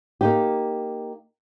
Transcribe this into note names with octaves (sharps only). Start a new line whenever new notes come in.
A#3 D#4 G4